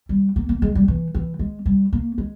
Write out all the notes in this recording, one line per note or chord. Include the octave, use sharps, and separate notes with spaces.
G3
A#3
A#3
G#3
G3
E3
E3
G#3
G3
A#3
G#3